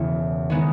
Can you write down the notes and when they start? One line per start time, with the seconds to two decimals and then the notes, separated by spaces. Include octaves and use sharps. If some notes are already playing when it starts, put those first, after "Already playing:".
Already playing: E1 E2 C#3
0.50 D#3 G#3 B3 D#4